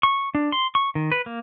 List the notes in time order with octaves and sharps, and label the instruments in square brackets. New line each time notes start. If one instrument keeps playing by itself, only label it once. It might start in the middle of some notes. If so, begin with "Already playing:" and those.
[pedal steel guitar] C#6
D4
C6
C#6
D#3
B4
A#3